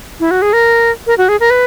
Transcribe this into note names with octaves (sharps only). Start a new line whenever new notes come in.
E4
F#4
G#4
A#4
A#4
F#4
G#4
A#4
B4